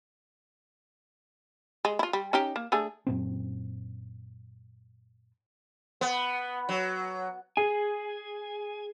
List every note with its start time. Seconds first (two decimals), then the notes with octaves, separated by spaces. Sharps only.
1.85 G#3
1.99 E4 F4
2.13 G3
2.33 C#4 D#4 G4
2.56 A#3
2.72 A3 D4 G#4
3.07 F#2 A#2 C4
6.01 B3
6.69 F#3
7.57 G#4 G#5